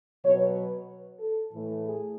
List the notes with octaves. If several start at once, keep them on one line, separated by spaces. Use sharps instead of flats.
B2 F#3 B3 C#5
B4
A4
A2 E3 A3
G#4